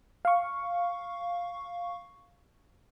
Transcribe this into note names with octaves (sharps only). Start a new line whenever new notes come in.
F5 C#6